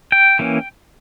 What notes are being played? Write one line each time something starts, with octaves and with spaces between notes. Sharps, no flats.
G5
E3 A#3 C#4